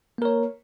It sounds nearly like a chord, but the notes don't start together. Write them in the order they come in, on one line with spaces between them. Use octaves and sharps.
A#3 A#4 C#5